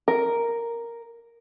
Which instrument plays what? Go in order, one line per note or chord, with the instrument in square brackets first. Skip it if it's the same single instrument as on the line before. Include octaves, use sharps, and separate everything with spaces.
[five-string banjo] A#4